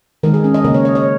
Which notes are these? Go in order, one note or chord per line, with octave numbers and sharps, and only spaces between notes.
D#3 G#3 A#4
G#4
C#4
D#5
C#3 A#3 A#4
C#5
D#5
C#5